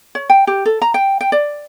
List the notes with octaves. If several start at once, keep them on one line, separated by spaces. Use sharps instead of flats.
C#5
G5
G4
A4
A#5
G5
G5
D5